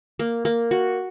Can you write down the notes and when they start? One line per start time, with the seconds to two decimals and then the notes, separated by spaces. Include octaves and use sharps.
0.19 A#3
0.45 A#3
0.71 F#4